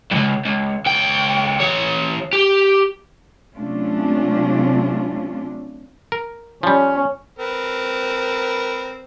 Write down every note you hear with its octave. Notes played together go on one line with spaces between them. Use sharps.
C#2 G2
C#2
C#2 G5
E3 C#5
G4
C3 F#3 A3 C#4 D4 F4
A#4
F3 G3 C#4
C4 A#4 B4